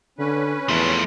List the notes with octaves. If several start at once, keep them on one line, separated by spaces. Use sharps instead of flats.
D3 C#4 B4
E2 F3 A3